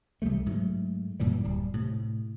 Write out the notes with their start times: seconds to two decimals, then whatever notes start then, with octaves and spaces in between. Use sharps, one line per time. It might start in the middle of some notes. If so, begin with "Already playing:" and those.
0.22 C2 E3 G3 A3
0.46 G#2 F#3 A3
1.20 F#2 A#2 E3 G3
1.44 D1 G3
1.74 A2 C3